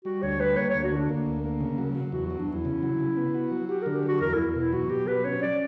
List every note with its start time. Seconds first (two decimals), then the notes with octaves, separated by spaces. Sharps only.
0.05 G3 F#4
0.23 D2 C#5
0.40 G3 B4
0.57 A#3 C#5
0.70 D2 C#5
0.83 F#4
0.92 D3 D4
1.09 A#3
1.26 D2
1.44 A#3
1.60 C#3
1.78 F#3
1.95 F#3
2.12 E2 F#4
2.26 F#3 F#4
2.39 D4
2.47 E2 E4
2.65 C#3
2.83 F#3
3.00 C#3
3.17 B3
3.34 F#4
3.52 F#3
3.69 F#4 G4
3.82 D3 A#4
3.95 G4
4.03 F#3 F#4
4.21 E2 A#4
4.34 E2 E4
4.55 B2 E4
4.73 F#3 F#4
4.90 B2 G4
5.07 F#3 B4
5.25 C#4 C#5
5.41 C#4 D5